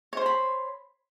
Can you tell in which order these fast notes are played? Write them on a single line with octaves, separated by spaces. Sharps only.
C#5 C5 C6 B5